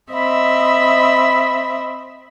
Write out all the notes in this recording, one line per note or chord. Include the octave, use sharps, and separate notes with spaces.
C4 D#5 E5 B5